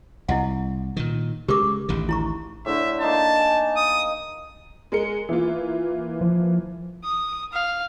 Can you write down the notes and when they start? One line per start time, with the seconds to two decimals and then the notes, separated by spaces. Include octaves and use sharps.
0.29 C2 E4 D#5 F#5
0.97 A#2 D#3
1.48 C#3 G#3 G4 A#4 D6
1.89 A1 D2 D#3
2.09 E4 A#5 C#6
2.66 A2 D3 E5
3.01 A#3 D#4 A5 C6
3.39 G#5
3.77 D#6
4.92 G#3 A#4 C#7
5.29 E3 A#3 F4
6.21 F3
7.04 D#6
7.53 F5